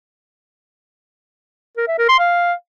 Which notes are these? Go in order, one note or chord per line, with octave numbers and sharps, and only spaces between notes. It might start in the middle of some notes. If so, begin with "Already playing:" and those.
A#4
E5
A#4
C6
F5